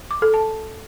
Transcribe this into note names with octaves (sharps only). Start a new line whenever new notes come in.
D6
A4
A5